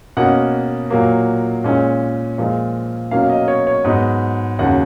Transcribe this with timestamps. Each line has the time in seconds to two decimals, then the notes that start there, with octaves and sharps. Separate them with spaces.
0.17 B2 A#3 C#4 F#5
0.90 A#2 F#3 A#3
1.64 A#2 G#3 C#4
2.38 A#2 F3 G#3
3.11 B2 F#3 A#3 C#4 F5
3.30 D#5
3.48 C#5
3.67 C#5
3.85 G#2 F#3 B3 D#5
4.59 D#2 C#3 F#3 F#5